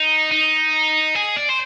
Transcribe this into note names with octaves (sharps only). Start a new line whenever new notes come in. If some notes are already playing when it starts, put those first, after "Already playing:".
Already playing: D#4
D#4
G#4
D5
C5